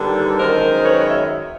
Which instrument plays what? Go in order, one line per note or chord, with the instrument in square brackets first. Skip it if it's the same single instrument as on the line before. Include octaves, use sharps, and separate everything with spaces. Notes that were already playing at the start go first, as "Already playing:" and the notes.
Already playing: [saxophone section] D#2 D3 G3 A4 B4
F#2 D#3 G#3 A#4 C5
B4 C#5
C#5 D#5
E5